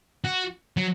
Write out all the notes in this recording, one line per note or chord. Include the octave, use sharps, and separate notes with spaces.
F#4
F#3